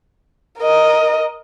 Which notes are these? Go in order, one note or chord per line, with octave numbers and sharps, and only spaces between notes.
A#4 D#5